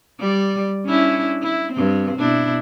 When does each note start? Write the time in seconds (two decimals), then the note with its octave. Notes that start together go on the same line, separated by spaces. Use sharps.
0.19 G3 D5
0.86 C#4 D4 E4
1.43 E4
1.73 G2 C4
2.18 B2 D4 E4